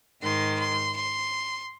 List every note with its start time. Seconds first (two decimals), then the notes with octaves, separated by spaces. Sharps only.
0.22 G#2 D#3 C6
0.59 C6
0.97 C6